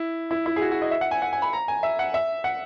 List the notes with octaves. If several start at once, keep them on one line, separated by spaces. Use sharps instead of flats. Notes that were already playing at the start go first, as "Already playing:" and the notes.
Already playing: E4
E4
E4
G#4
F#4
F#4
D#5
E5
F#5
G#5
F#5
G#5
B5
A#5
G#5
E5
F#5
E5
F#5